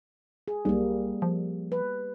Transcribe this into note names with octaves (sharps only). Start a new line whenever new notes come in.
G#4
B1 G3 A#3
F3
B4